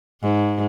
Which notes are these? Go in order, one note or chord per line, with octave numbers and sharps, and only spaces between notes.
G#2